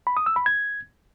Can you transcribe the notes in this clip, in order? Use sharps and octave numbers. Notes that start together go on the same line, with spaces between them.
B5
D#6
E6
B5
G#6